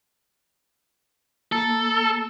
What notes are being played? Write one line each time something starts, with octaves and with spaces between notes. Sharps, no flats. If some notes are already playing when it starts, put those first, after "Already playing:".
A#3 A4